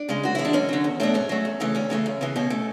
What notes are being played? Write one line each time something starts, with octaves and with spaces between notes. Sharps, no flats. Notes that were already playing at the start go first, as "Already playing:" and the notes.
Already playing: D4
C#3 G#3
F#2 F#4
E3 G#3 E4
D4
F#2 C#4
D3 F#3
E2
B2 F#3 A3 D4
G#2 C#4
F#3 A3
E2
C#3 E3 A3
D2 C#4
C#3 E3 A3
F#2
C#3 E3
B2 C#4
A3